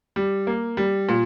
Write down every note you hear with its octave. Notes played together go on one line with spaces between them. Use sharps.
G3
A#3
G3
A#2